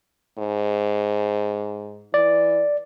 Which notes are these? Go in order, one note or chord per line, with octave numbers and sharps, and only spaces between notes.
G#2
E3 D5